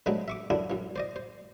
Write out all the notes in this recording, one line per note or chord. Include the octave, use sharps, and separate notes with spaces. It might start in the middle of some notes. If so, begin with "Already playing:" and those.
D3 F#3 G#3 A3 B3 C4
E5 C#6 D6
F#2 D3 D4 E4
F#2 E3
C5 D5 D#5
C5